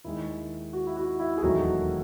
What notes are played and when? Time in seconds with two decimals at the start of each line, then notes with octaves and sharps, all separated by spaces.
0.04 D#2 D#3 G#3 E4
0.73 F#4
0.87 E4
0.96 F#4
1.19 E4
1.38 G#4
1.42 E1 D#2 D#3 F#3 A3 F#4